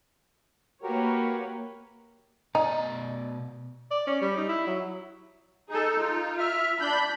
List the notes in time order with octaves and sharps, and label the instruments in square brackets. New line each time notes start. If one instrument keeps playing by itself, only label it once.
[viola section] A#3 B4 C#5 [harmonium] F#4 G4 A#4
[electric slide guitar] B2 D5 [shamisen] D#4
[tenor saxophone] D5
C#4
G3
D#4
E4
F#3
[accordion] D#4 [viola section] G#4 A4
[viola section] F4
[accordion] E5 F6
[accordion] D4 G6 [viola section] B5